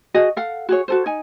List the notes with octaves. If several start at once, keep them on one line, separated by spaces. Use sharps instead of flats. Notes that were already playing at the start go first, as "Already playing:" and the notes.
F#4 G#4 D#5
A4 F5 F#5
F#4 G#4 C#5
F#4 A4 C5
D#4 G#5